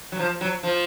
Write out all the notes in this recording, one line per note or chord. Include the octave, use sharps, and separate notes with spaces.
F#3
F3
F#3
F3